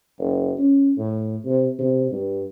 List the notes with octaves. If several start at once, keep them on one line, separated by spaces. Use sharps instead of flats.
F#1
C#4
A2
C3
C3
G2